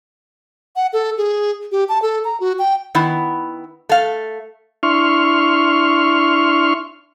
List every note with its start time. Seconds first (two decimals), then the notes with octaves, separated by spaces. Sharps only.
0.76 F#5
0.93 A4
1.18 G#4
1.72 G4
1.89 A5
2.02 A4
2.25 A#5
2.40 F#4
2.59 G5
2.95 D#3 B3 E4
3.89 A3 F5
4.83 D4 E4 C6 C#6 F6